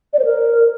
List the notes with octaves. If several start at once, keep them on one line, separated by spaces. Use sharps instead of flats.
D5
C5
A#4